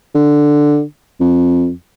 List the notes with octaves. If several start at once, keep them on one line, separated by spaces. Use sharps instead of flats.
D3
F2